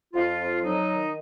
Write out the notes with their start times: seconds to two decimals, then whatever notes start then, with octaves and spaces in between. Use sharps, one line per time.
0.14 F2 F4
0.39 F2
0.64 F#3 D#4
0.89 D#3